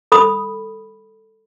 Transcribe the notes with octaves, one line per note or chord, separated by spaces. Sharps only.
A4 B5 D#6